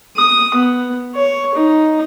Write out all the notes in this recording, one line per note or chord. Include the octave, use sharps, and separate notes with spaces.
D#6
B3
C#5
D#4